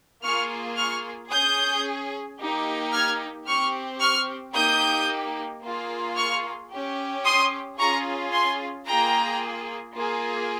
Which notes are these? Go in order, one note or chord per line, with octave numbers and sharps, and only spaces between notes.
A#3 F4 G#4 C#6 F6
C#6 F6
C#4 G#4 D#6 G6
A#3 D#4 G4
F6 G#6
C4 G4 C#6 F6
C#6 F6
A#3 D#4 G4 D#6 G6
A#3 F4 G#4
C#6 F6
C#4 G4
C6 D#6
C#4 F4 G#4 A#5 C#6
G#5 C6
A#3 F4 G#4 G5 A#5
A#3 F4 G#4